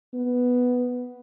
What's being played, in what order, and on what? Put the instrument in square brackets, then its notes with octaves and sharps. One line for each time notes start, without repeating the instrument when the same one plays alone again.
[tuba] B3